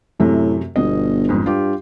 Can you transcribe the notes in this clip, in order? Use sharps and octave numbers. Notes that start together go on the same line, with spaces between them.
F#2 A2 C3 A3
G1 B2 D#5
F2 G#2
G2 F4 G4